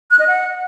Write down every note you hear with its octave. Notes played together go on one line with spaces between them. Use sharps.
F#6
D#5
F#5